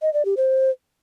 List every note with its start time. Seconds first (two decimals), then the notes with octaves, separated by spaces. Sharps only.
0.02 D#5
0.14 D5
0.25 G4
0.37 C5